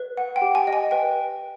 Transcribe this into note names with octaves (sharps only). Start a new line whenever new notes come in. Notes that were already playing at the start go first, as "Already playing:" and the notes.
Already playing: B4
F#5
G5
G4
G#5
D#5
G#5
B4 G5